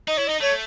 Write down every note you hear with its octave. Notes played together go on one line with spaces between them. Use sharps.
D#4 D#5
E4 C#5
D#4 D#5
A3 C#5